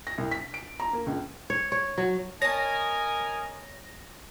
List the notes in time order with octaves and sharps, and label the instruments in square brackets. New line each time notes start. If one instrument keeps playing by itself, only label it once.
[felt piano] A#6
C2
B6
D7
A#5
A#3
C#2
[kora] C#5
C#5
F#3
[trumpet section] A#4 D#5 G#5 [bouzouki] C#5 A5 [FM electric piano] A#6